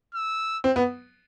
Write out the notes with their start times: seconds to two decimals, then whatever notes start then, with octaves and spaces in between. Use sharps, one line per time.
0.14 E6
0.64 C4
0.76 B3